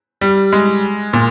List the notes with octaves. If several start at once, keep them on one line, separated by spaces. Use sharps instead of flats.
G3
G#3
A#2